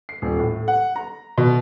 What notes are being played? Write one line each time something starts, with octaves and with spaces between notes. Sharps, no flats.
C7
D#1
A2
F#5
A#5
B2